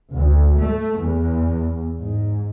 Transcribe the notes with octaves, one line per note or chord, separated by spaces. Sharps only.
D2
A3
E2
G#2